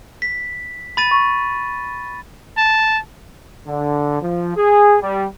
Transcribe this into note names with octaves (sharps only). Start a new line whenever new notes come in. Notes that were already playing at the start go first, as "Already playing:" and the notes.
B6
B5 A6 D#7
C#6
A5
D3
F3
G#4
G3